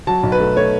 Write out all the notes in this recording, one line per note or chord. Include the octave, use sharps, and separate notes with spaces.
F#3 A5
B1
B4
A3
A3 C#5